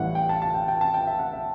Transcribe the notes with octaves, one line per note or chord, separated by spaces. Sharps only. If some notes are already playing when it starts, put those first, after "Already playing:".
Already playing: A1 A2 E3 G3 F#5
G5
A5
A5
G5
G5
A5
G5
E5
F#5
E5